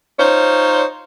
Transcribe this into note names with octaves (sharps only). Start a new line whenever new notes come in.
D#4 F4 C5 C#5